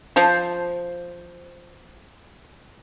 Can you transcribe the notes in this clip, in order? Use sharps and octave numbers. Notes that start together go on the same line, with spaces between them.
F3 C5